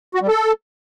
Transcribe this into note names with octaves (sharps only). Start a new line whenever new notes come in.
F#4
G3
A4